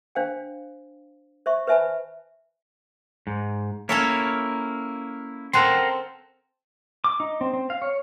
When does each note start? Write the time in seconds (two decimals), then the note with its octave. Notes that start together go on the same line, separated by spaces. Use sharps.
0.15 D4 C5 F5 G5
1.46 C5 E5 C#6
1.67 B4 C5 E5 G#5 A5 B5
3.27 G#2
3.89 A#3 C#4 E4 A4 C#5
5.53 C4 A4 A#4 F#5 C6
7.04 D6
7.20 D#4
7.41 C4
7.53 C4
7.70 F5
7.82 C#5